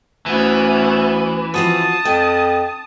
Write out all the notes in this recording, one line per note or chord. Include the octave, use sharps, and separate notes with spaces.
D2 E3 B3 C#4
F3 C4 F#4 A5 D#6
F2 G5